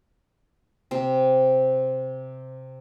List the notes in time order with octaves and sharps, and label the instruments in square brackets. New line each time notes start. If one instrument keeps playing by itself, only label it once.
[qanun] C3 C4